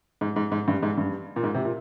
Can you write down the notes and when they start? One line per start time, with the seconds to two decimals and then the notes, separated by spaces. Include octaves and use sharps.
0.21 G#2
0.36 G#2
0.52 G#2
0.68 G2
0.83 G#2
0.98 G2
1.36 A#2
1.43 G#2
1.54 C3
1.65 A#2